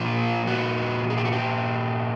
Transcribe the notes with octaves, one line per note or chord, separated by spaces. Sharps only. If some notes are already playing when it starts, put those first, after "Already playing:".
Already playing: A#2 F3 F4
F#4
G#4
G4
F#4
G4